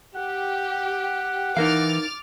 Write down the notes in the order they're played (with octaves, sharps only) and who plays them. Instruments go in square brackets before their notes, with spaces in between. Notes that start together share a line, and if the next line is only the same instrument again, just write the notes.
[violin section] G4 [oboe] F#5
[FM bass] E3 [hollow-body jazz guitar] D#4 A#4 F5 [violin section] D6 F6 A6